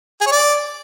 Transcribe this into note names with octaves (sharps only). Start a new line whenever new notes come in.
G#4
C#5
D5